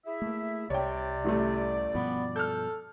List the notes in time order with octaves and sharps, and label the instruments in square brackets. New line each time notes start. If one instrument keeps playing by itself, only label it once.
[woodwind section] E4 G#4 E5
[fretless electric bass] A3 A#3
[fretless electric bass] C2 [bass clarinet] C3 [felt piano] C#5 G5 [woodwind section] D5
[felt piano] A1 G3 A3
[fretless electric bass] G2 B2 F3 [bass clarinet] B3
[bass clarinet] A4 [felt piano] F6 G6